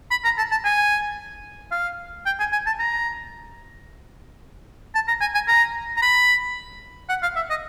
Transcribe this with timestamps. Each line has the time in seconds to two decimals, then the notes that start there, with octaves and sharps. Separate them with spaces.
0.11 B5
0.24 A#5
0.38 A5
0.51 A5
0.65 G#5
1.71 F5
2.26 G5
2.39 G#5
2.52 G#5
2.66 A5
2.79 A#5
4.95 A5
5.08 A#5
5.21 G#5
5.34 G#5
5.48 A#5
5.96 A#5
6.02 B5
7.09 F#5
7.22 F5
7.36 E5
7.50 D#5